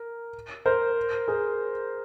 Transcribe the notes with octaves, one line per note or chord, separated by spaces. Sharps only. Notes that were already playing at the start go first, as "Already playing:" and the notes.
Already playing: A#4
A#4 C5
G#4 A#4